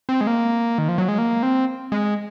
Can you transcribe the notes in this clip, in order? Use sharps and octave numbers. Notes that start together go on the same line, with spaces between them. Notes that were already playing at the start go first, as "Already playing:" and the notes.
C4
G#3
A#3
D#3
F3
F#3
G#3
A#3
C4
G#3